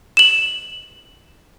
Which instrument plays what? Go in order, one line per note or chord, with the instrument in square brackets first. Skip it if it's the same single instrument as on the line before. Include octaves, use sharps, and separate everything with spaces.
[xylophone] E7 F#7